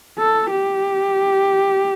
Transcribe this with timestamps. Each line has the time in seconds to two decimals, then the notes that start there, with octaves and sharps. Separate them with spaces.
0.18 A4
0.49 G4